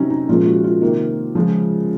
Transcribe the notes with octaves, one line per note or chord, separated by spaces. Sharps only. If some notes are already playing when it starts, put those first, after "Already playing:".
Already playing: C3 F#3 C4 C#4 D#4
D#4
A#2 F3 G#3 C#4 F4
F#4
F4
C3 D#3 A#3
C#3 F3 G#3 C#4